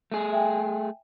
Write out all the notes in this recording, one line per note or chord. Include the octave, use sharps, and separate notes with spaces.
A3 G#4
E5 G5 G#5